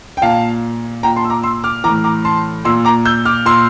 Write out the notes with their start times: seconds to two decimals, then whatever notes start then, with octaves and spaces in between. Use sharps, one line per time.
0.17 G5
0.22 A#2 F5 A5
1.03 A#2 G5 A#5
1.16 A5 C6
1.24 E6
1.30 A#5 D6
1.43 C6 E6
1.64 D6 F6
1.84 E3 A#5 D6
1.89 A2
2.04 A#5 D6
2.25 A5 C6
2.65 A#2 C6 E6
2.85 A#5 D6
3.05 E6 G6
3.25 D6 F6
3.45 A#2 C6 E6